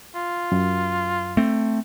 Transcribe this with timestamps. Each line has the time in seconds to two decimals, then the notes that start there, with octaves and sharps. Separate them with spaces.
0.15 F4
0.52 F#2
1.37 A3 C4